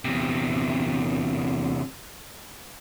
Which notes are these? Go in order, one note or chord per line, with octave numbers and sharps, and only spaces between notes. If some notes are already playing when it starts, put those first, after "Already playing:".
E2 C3